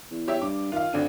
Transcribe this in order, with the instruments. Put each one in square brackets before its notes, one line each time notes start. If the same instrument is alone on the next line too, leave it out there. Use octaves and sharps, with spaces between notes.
[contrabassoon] E2
[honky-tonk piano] G4 C#5 E5
[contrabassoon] G2 [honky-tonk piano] D6
[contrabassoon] D#3 [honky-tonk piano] F4 F5
[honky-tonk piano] G#1 D4 D#7 [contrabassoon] D3